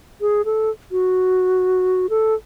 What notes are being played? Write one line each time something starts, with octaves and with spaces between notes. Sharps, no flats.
G#4
A4
F#4
A4